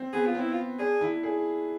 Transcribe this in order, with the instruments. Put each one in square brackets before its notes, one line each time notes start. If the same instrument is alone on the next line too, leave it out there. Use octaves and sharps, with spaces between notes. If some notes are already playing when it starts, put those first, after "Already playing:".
Already playing: [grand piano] C4
[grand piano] B3 [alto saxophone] G#4
[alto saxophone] F4
[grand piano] C4 [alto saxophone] E4
[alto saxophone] F4
[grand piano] D4 [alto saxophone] G#4
[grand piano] E4
G#4